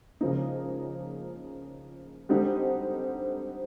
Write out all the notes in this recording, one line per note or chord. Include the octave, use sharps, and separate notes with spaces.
C#3 F3 A#3 D#4
D3 G3 C4 D#4